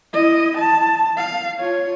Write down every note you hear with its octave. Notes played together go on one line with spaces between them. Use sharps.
E4 D#5
A5
F5
F4 C#5